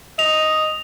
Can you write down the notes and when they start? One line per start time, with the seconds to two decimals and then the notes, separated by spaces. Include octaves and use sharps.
0.19 D#5 F7